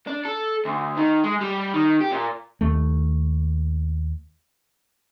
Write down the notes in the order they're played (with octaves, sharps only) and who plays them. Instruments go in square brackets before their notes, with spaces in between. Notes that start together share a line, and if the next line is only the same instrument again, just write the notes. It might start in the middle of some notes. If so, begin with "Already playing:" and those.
[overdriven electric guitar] D4
A4
D2
D#3
G#3
G3
D#3
G4
A#2
[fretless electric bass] D#2 A3